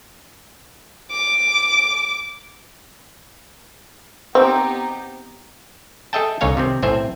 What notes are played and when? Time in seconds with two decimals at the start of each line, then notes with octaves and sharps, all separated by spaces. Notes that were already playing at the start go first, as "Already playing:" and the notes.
1.10 D6
4.35 B3 C4 D#4 G4
6.13 G#4 A4 D#5 E5 G5 A5
6.41 C2 D3 D#4 C#5 F5 G#5
6.57 C3 D#3 C4
6.82 B1 A2 C4 C5 E5 G#5